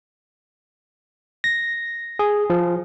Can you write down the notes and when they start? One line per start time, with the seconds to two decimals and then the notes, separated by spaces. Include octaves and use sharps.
1.44 A#6
2.19 G#4
2.50 F3